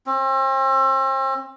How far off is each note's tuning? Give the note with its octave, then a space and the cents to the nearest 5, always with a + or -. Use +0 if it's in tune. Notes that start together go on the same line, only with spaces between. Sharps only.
C4 +40